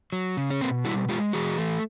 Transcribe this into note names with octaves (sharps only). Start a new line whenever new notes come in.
F#3
C#3
C#4
B2 A#3 C4
G3 E4 F#4
G#3 F4 G4
E3 F#4 G#4
A3